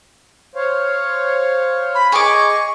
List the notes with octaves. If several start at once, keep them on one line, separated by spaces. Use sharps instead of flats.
C5 C#5 F5
B5
G#4 D#5 G#5 C#6 D6